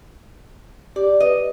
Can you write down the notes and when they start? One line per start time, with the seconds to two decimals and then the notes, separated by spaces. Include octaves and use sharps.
0.96 G4 D5
1.20 B4 D#5